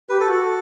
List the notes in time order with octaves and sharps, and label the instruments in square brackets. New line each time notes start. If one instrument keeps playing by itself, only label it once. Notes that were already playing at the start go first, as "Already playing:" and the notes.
[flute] G4 [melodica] B4
[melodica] A4
[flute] F#4
[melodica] A4